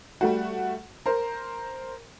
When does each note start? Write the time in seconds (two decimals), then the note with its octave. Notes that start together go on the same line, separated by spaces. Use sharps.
0.21 G3 A3 F#4
1.06 A#4 C5